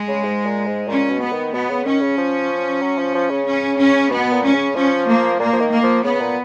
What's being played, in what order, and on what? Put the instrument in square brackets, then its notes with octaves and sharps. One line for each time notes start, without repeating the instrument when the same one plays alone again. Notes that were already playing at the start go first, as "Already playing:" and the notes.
Already playing: [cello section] G#3
[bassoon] C#3
G#2
A#2
G#2
[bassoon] A#2 [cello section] C#4
[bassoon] B2
[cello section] B3
[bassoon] D#3
[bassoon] B2 [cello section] B3
[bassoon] C#3
[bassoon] D#3 [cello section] C#4
[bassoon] C#3
F3
F#3
F3
F3
C#3
[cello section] C#4
C#4
[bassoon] B2 [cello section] B3
[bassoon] A#2
[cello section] C#4
[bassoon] C#3
[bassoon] F3 [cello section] C#4
[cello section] A#3
[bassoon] A#2 [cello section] A#3
[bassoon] F3
D#3
[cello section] A#3
[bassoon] F3
[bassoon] C#3 [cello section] B3
[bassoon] A#2